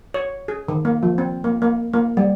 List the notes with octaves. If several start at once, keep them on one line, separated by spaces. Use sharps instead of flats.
C#5
G#4
D#3
A#3
F3
C4
A#3
A#3
A#3
G3